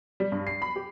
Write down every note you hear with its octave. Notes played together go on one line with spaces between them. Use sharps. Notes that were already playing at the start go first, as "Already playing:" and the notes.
G3
G2
C7
B5
G4